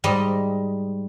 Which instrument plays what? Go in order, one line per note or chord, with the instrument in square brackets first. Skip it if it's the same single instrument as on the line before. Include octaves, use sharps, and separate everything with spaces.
[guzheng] G#2 G3 D#5